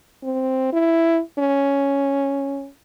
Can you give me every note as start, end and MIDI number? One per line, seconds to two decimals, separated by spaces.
0.24 0.72 60
0.73 1.20 64
1.39 2.68 61